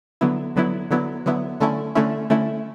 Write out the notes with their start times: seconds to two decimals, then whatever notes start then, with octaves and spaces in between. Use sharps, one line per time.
0.21 D3 F#3 B3 E4
0.56 D3 F#3 B3 E4
0.91 D3 F#3 B3 E4
1.26 D3 F#3 B3 E4
1.60 D3 A3 C#4 E4
1.95 D3 A3 C#4 E4
2.30 D3 A3 C#4 E4